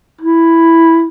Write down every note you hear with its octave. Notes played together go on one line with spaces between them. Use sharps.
E4